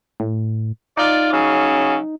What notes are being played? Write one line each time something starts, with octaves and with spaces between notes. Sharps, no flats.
A2
D#4 F4 D5
C#3 F#3 C#4